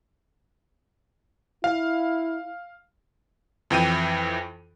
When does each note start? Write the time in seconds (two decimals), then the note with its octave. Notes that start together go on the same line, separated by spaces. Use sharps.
1.64 E4 F5
3.71 F2 E3 G5 D#7